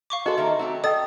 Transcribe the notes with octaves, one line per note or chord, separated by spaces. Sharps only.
F5 C#6 D6
F#4 G#4 A4 B4 D#5 C6
D#3 A#3 D#4 E5
A3 C4 F#4 G4
A4 D#5 G5 D#6 A6